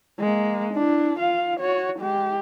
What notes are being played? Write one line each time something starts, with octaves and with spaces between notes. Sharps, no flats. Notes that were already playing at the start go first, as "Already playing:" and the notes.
G#3 A#3
D4 E4
F4 F5
F#4 C#5
G#3 G4